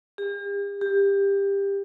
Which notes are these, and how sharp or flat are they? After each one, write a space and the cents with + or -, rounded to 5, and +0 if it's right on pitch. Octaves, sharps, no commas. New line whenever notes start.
G4 +45
G4 +20